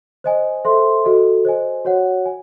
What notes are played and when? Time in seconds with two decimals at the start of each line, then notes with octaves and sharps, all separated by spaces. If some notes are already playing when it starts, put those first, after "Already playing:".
0.24 C5 D#5 G#5
0.65 A4 C5 E5 C6
1.05 F#4 A4 D#5
1.45 C5 D#5 G#5
1.85 F#4 C#5 F#5
2.26 G#5